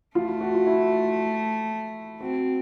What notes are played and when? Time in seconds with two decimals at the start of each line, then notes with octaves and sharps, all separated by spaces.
0.15 A3 F4
0.28 F4
0.41 F#4
0.54 F4
0.67 E4
2.20 C4 F#4